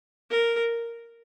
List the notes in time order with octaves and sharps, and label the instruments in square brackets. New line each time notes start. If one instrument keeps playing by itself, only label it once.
[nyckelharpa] A#4